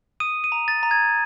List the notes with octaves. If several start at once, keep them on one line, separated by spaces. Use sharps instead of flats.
D#6 D#7
D#7
A#5
A6
A#5
G#6